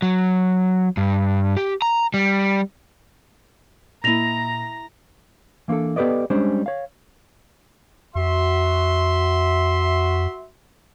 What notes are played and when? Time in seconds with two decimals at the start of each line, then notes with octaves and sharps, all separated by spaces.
0.02 F#3
0.97 G2
1.57 G4
1.82 A#5
2.14 G3
4.04 A#2 A#3 E4 D#5 E5 A#5 A#6 F7
5.68 E3 A#3 C4 D4 A4
5.96 B3 G4 A4 B4 D5 D#5
6.30 G3 G#3 C#4 D4 C5
6.66 C#5 F5
8.15 F2 F#4 E5 C6